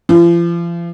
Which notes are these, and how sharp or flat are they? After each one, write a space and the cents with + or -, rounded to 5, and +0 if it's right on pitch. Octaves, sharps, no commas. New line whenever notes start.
F3 -40